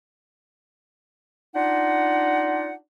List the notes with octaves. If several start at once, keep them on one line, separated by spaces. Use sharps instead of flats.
D4 D#4 F4 F#5